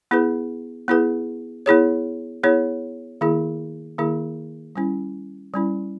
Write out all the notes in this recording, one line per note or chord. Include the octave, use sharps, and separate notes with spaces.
B3 E4 G#4 B4
B3 E4 G#4 B4
B3 E4 G#4 C#5
B3 E4 G#4 C#5
D#3 A#3 E4 G#4
D#3 A#3 E4 G#4
G3 C#4 E4
G3 C#4 E4